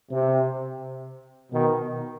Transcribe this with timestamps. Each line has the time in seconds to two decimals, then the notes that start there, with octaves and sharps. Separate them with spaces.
0.11 C3
1.52 B2 D#3